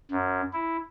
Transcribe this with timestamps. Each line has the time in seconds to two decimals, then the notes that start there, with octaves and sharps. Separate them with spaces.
0.11 F#2
0.53 E4